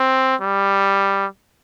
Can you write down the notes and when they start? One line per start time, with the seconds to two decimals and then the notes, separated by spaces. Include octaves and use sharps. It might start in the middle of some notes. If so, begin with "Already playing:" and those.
Already playing: C4
0.41 G3